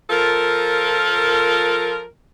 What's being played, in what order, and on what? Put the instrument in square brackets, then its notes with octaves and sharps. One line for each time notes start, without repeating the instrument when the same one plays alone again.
[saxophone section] F3 F4 A4 A#4